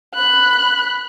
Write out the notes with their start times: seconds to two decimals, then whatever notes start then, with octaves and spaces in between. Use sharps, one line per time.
0.15 B5 F#6